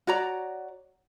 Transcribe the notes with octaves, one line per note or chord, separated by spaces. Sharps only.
F#4 C#5 D5 A#5